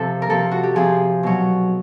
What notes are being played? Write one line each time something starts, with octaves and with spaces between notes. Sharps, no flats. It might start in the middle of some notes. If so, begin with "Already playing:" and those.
Already playing: C3 F3 A4
A#4
C3 F3 A4
F#4
G4
C3 F3 G#4
B2 F#3